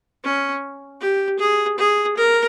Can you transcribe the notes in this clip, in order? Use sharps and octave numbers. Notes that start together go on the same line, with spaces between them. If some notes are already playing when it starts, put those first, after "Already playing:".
C#4
G4
G#4
G#4
A#4